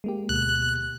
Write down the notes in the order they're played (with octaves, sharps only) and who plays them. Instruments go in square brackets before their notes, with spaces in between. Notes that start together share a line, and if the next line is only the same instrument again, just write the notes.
[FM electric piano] G#3 A#3 G4
[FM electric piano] D2 B2 [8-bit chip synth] F#6